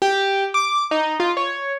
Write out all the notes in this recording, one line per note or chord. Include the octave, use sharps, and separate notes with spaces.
G4
D6
D#4
F4
C#5